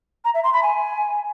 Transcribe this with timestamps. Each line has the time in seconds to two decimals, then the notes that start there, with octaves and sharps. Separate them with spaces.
0.24 A#5
0.34 E5
0.44 C6
0.53 B5
0.63 G#5